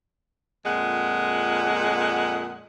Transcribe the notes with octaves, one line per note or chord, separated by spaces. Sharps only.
F2 A#2 G#3 F#5